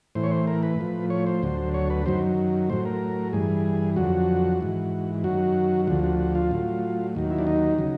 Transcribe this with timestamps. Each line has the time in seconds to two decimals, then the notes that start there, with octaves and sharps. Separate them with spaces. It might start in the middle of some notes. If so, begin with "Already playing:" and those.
0.15 A2 E3 C5
0.23 C#5
0.31 C5
0.47 A#4
0.63 B4
0.79 A2 F3
1.10 C#5
1.27 C5
1.43 D2 D3 F#3
1.74 C#5
1.90 B4
2.06 F#2 D#3 F#3 C5
2.70 A2 F#3 C5
2.85 A#4
3.33 G2 E3 G#4
3.96 F2 D3 F#3 F#4
4.61 G#2 E3
5.24 F#2 D#3 F#3 F#4
5.87 D2 D3 F3 F#4
6.04 F#4
6.19 F#4
6.35 F4
6.51 A2 F#3
7.15 D#2 D#3 F#3
7.30 E4
7.39 D4
7.47 D#4
7.78 C#3 F#3